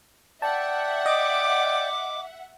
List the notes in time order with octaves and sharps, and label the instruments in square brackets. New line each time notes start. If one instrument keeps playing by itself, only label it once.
[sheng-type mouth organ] D5 G5 [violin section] E5 F#5 [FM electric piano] A5
[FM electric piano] D#5 [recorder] D6